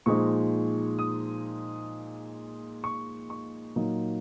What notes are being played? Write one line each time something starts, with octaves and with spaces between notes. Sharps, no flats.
A#2 F3 G#3 D#4 C#6
D#6
C#6
C#6
A#2 F#3 A#3 D#4